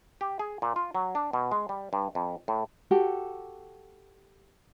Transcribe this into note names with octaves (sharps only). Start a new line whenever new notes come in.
G4
G#4
A#2
F4
F#3
D4
B2
G#3
G3
G2
F2
A2
F#4 G4 A4